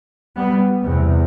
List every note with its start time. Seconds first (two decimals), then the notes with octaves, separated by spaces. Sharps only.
0.37 G3 B3
0.84 E2 C3 G3 B3